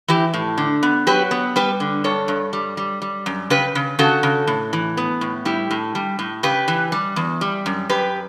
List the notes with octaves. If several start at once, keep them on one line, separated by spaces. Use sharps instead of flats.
E3 E4 G4
A2
D3
B3
F#3 G4 B4
B3
G3 G4 B4
D3
G2 A4 C#5
G2
G3
G3
G3
F#2
C#3 G4 B4
C#3
C#3 F#4 A4
C#3
A2
E3
B3
A2
G3 E4 G4
A2
G3
A2
C#3 G4 B4
E3
G3
E2
G3
F#2
F#2 G4 B4